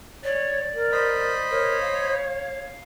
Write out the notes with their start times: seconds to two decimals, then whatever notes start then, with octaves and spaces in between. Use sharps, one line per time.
0.24 C#5 D5
0.74 A#4
0.92 C5 D#5 B5
1.50 A#4 C#5
1.81 F5